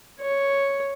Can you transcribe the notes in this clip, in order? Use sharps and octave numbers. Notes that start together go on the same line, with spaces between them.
C#5